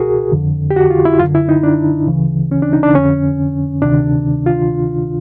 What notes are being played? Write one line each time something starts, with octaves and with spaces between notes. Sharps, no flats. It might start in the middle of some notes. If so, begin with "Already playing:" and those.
Already playing: C#2 B2 F#4 G#4 A#4
F2 D3
G4
F#4
F4
E4
F#2 D3 F4
E4
D#4
D4
D2 C#3 E3
C#4
D4
D#4
D4
F2 D3 C#4
D2 C3 D#3 D4
F4